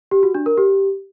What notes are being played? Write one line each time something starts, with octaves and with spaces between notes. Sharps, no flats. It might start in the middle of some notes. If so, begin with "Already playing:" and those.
G4
F#4
D4
A#4
G4